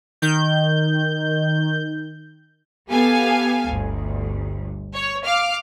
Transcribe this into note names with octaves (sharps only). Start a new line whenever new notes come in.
D#3 G6
B3 G4 A4 F5 G#5
G1 D2
C#5
F5 D6 F6